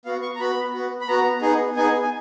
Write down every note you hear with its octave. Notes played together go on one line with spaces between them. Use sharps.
B3 F#4 F5
C#6
A#5
B3 F#4 B5
B3 F#4
B5
B3 F#4 A#5
B3 D#4 G#4
B3 D#4 G#4 G#5
G#5